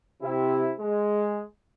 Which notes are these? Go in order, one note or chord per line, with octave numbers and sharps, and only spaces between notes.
C3 E4
G#3